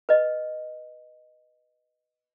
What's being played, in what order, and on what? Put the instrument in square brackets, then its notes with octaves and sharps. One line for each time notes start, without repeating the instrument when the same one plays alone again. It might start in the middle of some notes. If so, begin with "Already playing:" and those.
[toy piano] B4 D#5